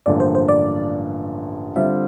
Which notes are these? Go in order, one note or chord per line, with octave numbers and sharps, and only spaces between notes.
A1 G2 D3 F3 A#3 D5
C5
C5
D5
D3 G3 C4 F4 E5